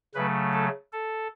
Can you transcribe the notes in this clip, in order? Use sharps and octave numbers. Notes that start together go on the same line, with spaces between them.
C#3 F#3 A3 B4
A4
A4